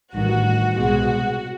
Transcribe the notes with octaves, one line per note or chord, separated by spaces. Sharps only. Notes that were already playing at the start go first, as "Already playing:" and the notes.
A1 G2 D#3 F#4
C2 B2 G#3 F#4